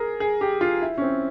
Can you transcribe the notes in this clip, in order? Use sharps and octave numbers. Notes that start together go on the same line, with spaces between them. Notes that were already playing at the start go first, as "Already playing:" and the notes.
Already playing: G#4 A#4
G#4
G4
F4
E4
C#4
C4